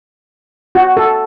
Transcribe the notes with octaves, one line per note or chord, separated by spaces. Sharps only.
F#4
A4